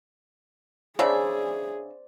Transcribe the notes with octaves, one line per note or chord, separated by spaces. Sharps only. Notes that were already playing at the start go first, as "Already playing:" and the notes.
C#3 D4 G#4 C5 D5 E5